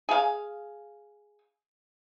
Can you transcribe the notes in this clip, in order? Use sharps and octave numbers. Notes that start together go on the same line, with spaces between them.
G#4 F5